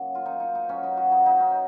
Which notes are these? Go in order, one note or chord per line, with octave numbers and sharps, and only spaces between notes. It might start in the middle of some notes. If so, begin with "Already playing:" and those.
Already playing: A#2 C#3 F#3 D#4
F4
D#4
D#4
D#4
B2 F#3 C#4
D#4
F#4
D#4
D#4
C#4